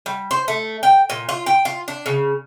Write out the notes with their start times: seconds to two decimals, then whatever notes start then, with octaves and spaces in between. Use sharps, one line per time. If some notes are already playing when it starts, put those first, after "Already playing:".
0.06 G3
0.31 C5
0.48 A3
0.83 G5
1.10 A#2
1.29 F4
1.46 G5
1.65 F4
1.88 D4
2.06 C#3